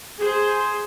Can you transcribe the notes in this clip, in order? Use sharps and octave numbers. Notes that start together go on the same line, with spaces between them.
G#4 C5